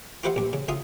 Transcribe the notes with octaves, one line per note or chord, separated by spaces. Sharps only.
F4 G4 B4 C5 E5 F#5
A#1 G2
C#3
C#2 F4 E5 D#6